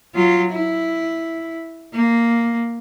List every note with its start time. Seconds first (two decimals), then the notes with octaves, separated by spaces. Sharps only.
0.15 F#3 F4
0.51 E4
1.94 A#3